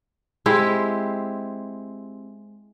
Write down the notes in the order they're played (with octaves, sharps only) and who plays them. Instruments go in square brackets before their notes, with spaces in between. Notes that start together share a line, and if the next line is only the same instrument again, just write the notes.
[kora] G#3 C4 E4 G4